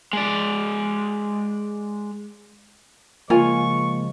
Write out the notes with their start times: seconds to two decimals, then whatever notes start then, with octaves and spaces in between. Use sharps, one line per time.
0.13 G#3 D5
3.30 C#3 F3 G#3 A#3 F4 G#5 C#6